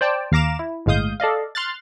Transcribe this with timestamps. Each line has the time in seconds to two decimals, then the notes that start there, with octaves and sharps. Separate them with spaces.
0.01 C5 D5 G5 A5
0.32 D#2 F5 A#5 D6 E7
0.59 E4
0.86 G1 A2 G#3 F5 D#6 G6
1.20 A4 D5 D#5 F5
1.55 C6 F6 F#6 A6